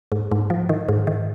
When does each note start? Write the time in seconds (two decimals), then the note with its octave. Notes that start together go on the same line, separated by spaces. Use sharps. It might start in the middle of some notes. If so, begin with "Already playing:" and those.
0.12 G#2
0.31 G#2
0.50 F3
0.69 D#3
0.88 G#2
1.07 D#3